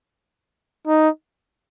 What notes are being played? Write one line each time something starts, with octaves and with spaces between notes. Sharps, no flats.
D#4